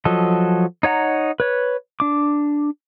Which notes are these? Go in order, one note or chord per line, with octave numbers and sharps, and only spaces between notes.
F3 F#3 A4 D#5
D#4 C#5 F#5 A#5
B4 C#5
D4 D6